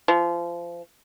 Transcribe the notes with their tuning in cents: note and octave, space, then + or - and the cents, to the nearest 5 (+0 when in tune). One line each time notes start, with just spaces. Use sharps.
F3 -25